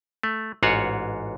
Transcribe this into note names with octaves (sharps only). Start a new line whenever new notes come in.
A3
A1 G#2 F4 F#4 C#5 F#5